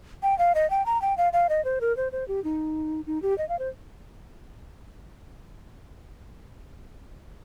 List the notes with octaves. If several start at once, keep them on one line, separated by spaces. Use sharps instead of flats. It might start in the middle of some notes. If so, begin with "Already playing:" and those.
G5
F5
D#5
G5
A#5
G5
F5
F5
D#5
C5
A#4
C5
C5
G4
D#4
D#4
G4
D#5
F5
C5